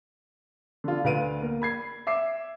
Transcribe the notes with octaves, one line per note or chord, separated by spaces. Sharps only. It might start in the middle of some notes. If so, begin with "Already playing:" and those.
D3 F4
D2 B4 F5 D7 D#7
A#3
B5 G#6 C7
E5 D6 C7